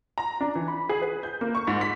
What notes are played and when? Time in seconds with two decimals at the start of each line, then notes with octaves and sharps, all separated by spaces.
0.18 A#5
0.41 D4
0.55 E3
0.68 B5
0.89 G#4
1.02 B4
1.23 G6
1.41 A#3
1.55 C#6
1.67 G#2
1.81 B6